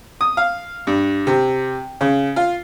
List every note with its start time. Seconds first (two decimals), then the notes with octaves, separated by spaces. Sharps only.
0.21 D#6
0.37 F5
0.87 G2
1.27 C3
2.01 C#3
2.36 F4